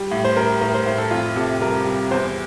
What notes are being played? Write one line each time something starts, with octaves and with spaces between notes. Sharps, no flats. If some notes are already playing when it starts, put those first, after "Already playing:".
Already playing: G3
A2
C5
G3 A#4
A2 A#4
C5
A2 C5
A4
F2 F4
C3 A4
G3 A#4
G3
E2 C5